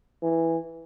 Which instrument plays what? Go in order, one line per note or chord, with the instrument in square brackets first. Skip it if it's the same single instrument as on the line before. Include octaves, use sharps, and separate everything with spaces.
[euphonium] E3